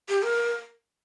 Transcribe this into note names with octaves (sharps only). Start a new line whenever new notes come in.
G4
A#4